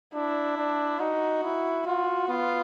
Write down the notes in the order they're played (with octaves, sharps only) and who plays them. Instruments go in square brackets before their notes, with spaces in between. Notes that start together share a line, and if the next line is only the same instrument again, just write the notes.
[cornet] D4 [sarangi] E4
[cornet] D4
[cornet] D#4 [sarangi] F#4
[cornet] E4
[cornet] F4 [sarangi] F#4
[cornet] B3 [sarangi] F4